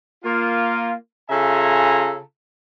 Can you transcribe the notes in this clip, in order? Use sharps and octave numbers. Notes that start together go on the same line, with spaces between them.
A#3 F4
C#3 F4 A4 E5 G#5 A#5